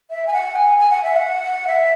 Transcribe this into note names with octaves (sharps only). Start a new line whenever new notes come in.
E5
G#5
F#5
G#5
G#5
F#5
E5
F#5
E5